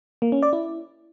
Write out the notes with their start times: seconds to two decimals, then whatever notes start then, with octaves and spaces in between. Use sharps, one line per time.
0.22 A#3
0.32 C#4
0.42 D5
0.53 E4